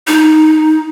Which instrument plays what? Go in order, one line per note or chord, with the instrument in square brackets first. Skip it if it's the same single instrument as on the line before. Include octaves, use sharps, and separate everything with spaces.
[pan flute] D#4